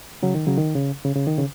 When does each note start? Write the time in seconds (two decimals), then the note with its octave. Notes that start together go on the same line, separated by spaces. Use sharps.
0.23 C#3 F#3
0.34 D#3
0.47 C#3 F#3
0.58 D#3
0.75 C#3
1.04 C#3
1.15 C#3
1.27 D#3
1.38 C#3